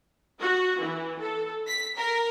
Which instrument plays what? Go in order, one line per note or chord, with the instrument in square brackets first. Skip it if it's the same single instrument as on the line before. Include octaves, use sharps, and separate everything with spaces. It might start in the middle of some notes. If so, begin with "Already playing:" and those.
[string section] F#4
E3
A4
B6
A#4